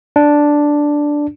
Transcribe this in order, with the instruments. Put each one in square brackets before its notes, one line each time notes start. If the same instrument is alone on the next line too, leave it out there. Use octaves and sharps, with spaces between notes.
[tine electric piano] D4